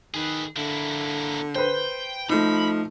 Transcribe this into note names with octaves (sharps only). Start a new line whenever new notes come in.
D#3 G#4 B4
D3 A#3 E4
B4 C5 G5
F3 A3 D#4 B5